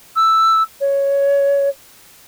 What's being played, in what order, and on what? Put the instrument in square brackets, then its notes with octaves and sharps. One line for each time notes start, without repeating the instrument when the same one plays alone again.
[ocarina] E6
C#5